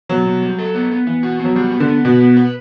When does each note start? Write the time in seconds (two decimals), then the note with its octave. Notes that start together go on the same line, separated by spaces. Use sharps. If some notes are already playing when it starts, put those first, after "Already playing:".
0.09 B2 F#3
0.26 B2
0.42 G3
0.59 A4
0.75 B3
0.91 B3
1.07 E3 B3
1.23 F#4
1.40 F#3 B3
1.56 G3 F#4
1.72 B3
1.80 D3
1.88 B3
2.05 B2 B4
2.21 B3
2.37 B4